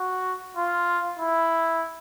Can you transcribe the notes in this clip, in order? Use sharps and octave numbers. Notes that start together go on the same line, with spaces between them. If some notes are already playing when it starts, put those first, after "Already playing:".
Already playing: F#4
F4
E4